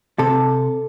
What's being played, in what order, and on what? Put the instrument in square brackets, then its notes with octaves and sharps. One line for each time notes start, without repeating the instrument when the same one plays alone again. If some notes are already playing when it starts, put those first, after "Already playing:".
[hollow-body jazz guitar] C3 A4